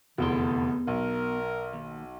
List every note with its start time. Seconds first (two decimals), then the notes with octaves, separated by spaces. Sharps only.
0.18 F1 E2 D3 B3 C6
0.88 B1 A#4
1.73 D#2